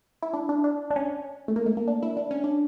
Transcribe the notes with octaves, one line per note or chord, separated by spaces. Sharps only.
E4
D4
D4
D4
D4
C#4
A3
A#3
A3
A#3
D4
E4
D4
C#4
D4